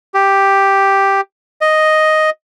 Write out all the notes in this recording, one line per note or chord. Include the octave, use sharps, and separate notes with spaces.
G4
D#5